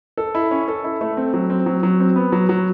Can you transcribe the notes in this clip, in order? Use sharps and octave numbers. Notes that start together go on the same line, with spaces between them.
A4
E4
C#4
A4
E4
A3
C4
F#3
C4
F#3
F#3
C4
B3
F#3
F#3